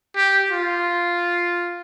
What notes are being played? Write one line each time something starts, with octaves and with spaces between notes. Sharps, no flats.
G4
F4